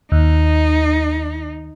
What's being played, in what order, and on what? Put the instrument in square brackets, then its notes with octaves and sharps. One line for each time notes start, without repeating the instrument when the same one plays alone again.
[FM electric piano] D#2 [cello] D#4